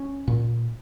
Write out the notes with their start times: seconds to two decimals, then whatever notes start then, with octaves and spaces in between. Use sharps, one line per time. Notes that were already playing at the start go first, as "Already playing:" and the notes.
Already playing: C#4
0.28 A#2